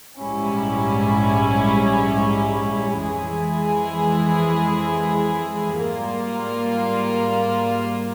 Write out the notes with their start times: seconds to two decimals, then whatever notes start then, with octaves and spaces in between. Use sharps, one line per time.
0.20 A#1 G#2 G3 C#4 E4
2.98 F2 E3 G#3 E4 G#4
5.77 G#2 G3 A#3 F4 A#4